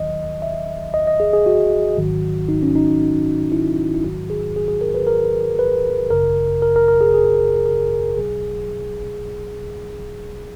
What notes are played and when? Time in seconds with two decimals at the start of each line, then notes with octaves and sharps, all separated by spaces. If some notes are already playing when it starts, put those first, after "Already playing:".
Already playing: D#2 D#3 F#3 D#5
0.42 E5
0.94 D#5
1.07 D#5
1.20 G#4
1.33 G#4
1.46 F#4
1.97 G#1 G#2 D#3 F#3
2.49 D#4
2.63 C#4
2.76 D#4
3.52 E4
3.94 E4
4.04 A#1 G#2 D#3 F#3 F#4
4.30 G#4
4.56 G#4
4.68 G#4
4.81 A#4
4.94 B4
5.07 A#4
5.59 B4
6.10 G#1 F#2 C#3 A#4
6.62 A#4
6.76 A#4
6.88 A#4
7.01 G#4
7.14 G#4
7.66 A#4
8.17 B1 B2 F#3 G#4